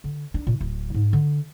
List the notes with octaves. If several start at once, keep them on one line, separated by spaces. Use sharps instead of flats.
D3
D4
A#2
D1
G#2
D3